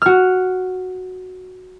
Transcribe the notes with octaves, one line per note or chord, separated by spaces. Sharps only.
F#4 F6